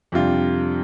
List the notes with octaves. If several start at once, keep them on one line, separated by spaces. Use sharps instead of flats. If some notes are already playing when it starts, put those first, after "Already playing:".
F2 C3 G3 D4 F4